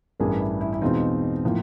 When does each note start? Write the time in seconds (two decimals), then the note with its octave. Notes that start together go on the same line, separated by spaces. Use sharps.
0.20 A1 G2 E3 G#4 A#4
0.41 E4
0.61 E4
0.73 E4
0.81 E2 B2 G#3 C4 D#4 F4
1.45 A2 F3 A#3